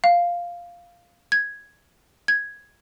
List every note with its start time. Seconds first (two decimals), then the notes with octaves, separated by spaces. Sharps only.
0.04 F5
1.32 G#6
2.28 G#6